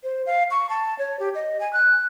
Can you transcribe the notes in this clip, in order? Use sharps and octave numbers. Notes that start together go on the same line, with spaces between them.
C5
F5
C#6
A5
C#5
G4
D#5
G#5
F#6